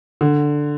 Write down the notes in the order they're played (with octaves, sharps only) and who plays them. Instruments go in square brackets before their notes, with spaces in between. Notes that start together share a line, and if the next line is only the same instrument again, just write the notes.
[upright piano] D3